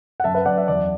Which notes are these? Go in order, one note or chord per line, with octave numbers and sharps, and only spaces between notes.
F#5
F#2 E5 A5
B4 E5
F#2 D5 F#5
E5
E2 D5